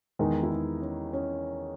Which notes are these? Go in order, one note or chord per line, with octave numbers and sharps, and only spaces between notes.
E2 D#3 G#3 D#4
E4
D#4
C#4
C#4